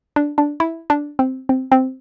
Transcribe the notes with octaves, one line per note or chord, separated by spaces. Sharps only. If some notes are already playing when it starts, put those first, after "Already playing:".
D4
D4
E4
D4
C4
C4
C4